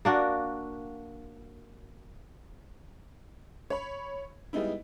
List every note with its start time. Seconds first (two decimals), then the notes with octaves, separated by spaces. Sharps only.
0.05 A#3 D4 F#4
3.70 C#5 B5
4.53 G3 G#3 B3 D#4 E4